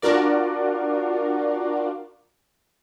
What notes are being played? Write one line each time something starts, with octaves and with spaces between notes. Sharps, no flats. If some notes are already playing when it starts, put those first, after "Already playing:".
D4 F4 F#4 A#4 D5